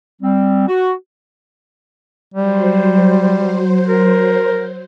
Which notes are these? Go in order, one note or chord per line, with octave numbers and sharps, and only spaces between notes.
G3 C4
F#4
F#3 G3 C5
A#4